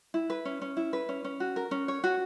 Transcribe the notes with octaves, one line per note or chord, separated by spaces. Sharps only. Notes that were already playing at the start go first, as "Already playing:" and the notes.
E4
B4
C#4
C#4
E4
B4
C#4
C#4
F#4
A#4
C#4
C#5
F#4